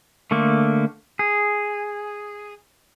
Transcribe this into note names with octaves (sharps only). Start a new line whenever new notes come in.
D3 A3 A#3
G#4